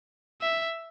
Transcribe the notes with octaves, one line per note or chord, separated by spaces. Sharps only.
E5